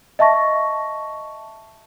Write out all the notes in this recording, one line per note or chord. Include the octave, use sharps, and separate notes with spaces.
D#5 E5 A5 C#6 A#6